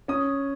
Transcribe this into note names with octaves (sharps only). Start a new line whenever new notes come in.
C#4 D#6